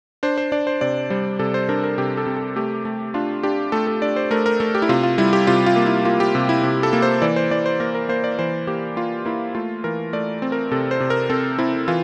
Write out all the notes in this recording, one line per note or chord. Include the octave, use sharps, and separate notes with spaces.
D4 C5
C5
D4 D5
C5
C3 D5
G3 C5
C3 A4
C5
D4 A#4
A#4
C3 G4
A4
C3
A4
A3 G4
A3
D4 F4
D4 G4
A3 A4
A4
D4 D5
C5
A3 A#4
A#4
A3 A4
G4
E4
C3 F4
F4
G3 E4
G4
C3 F4
F4
A#3
E4
A#3 F4
G4
C3
E4
C3
A4
A#3
C5
E3 D5
C5
E3 D5
C5
A#3 A#4
A#4
A#3 C5
D5
E3 C5
A#3 G4
A#3 F4
A#3 E4
A3 F4
E3 A#4
A3 D5
C4
A#4
C3 A4
C5
C3
A#4
C4 A4
C4 E4
E3 F4